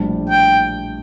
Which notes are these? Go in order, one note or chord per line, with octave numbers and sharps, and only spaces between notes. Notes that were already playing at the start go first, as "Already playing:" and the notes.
Already playing: A#1 A2 G3 D4 G4
G5